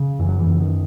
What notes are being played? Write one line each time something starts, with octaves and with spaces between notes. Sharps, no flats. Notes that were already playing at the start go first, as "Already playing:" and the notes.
Already playing: C#3
F#2 E3
F#3
E3
F#2
D#3